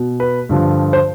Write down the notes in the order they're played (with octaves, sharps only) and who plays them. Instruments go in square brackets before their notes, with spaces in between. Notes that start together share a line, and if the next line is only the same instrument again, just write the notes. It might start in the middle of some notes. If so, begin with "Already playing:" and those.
Already playing: [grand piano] B2
B4
G2 D3 F3
C5